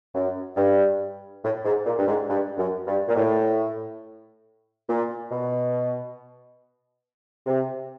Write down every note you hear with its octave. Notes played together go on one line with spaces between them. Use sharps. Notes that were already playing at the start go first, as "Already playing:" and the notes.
F#2
G2
A2
G#2
A#2
G2
G#2
G2
F#2
G2
A#2
A2
A#2
B2
C3